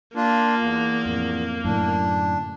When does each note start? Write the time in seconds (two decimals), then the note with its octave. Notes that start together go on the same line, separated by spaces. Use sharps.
0.16 A#3 D4 F4
0.59 E2
1.06 F2 A2
1.64 F#2 A2 D3 D4